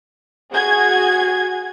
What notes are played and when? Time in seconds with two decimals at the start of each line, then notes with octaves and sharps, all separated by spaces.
0.51 F#4 G#4 G#6